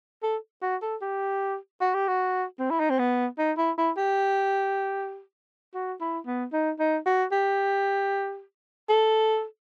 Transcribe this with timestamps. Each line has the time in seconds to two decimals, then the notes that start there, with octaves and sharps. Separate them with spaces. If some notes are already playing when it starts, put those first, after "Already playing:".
0.23 A4
0.62 F#4
0.82 A4
1.01 G4
1.81 F#4
1.94 G4
2.08 F#4
2.59 C4
2.70 E4
2.80 D#4
2.90 C4
2.99 B3
3.38 D#4
3.58 E4
3.78 E4
3.97 G4
5.74 F#4
6.01 E4
6.26 B3
6.53 D#4
6.79 D#4
7.06 F#4
7.32 G4
8.89 A4